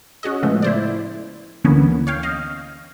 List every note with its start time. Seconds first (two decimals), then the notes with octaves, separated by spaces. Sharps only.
0.23 C#4 F#4 G#4 D#5
0.42 A2 C#3 F3 G#3 A3 B3
0.62 E4 C5 D5
1.64 D2 D3 E3 A#3 B3 C#4
2.07 C#5 F5 G5
2.23 D#5 F5